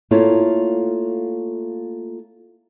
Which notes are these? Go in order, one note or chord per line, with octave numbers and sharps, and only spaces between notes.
A3 A#3 E4 F4 A4 C#5